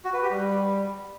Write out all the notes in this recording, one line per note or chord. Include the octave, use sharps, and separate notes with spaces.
F#4
B4
G4
G3